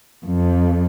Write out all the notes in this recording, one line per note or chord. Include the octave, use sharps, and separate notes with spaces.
F2